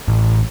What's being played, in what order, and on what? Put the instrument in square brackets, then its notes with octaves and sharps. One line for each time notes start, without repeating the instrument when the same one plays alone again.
[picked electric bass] A1